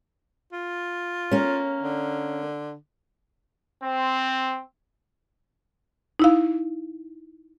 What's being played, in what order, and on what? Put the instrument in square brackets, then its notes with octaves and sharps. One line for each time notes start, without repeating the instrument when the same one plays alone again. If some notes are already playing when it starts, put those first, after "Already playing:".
[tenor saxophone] F4
[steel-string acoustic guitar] A#3 C#4
[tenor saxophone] D3
[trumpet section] C4
[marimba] D#4 E4 F5